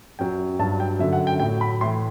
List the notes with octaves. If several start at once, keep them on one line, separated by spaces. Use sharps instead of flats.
F#2 F#3 G5
G2 F#3 A5
G5
F#2 D3 F#3 E5
F#5
G5
A2 F#3 G5
B5
A2 E3 C6